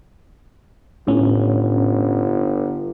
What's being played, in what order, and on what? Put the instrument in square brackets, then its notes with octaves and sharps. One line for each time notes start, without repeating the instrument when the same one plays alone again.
[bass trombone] G1 [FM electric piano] A2 C#4